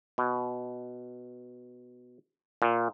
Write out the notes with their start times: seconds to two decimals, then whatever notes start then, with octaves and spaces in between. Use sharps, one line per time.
0.18 B2
2.62 A#2